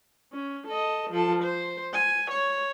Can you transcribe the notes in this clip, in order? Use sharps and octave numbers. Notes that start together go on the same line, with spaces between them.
C#4
A4 D#5
F3 A4
C5
G#5
C#5